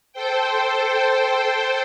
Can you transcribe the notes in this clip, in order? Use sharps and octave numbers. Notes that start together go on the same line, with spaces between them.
A4 C5 G5